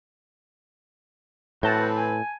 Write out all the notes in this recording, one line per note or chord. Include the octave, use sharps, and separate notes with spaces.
A2 E3 C4 F#4 B4 A5 G6
G#5